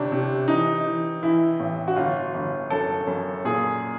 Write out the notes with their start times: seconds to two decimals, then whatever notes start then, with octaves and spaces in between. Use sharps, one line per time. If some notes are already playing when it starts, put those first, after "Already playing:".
Already playing: G1 C3 D4
0.12 C3
0.48 E3 D#4
0.85 E3
1.23 E3 E4
1.60 A1
1.88 F#4
1.96 G1 F4
2.34 G1
2.70 F#2 A4
3.07 F#2
3.45 A#2 G#4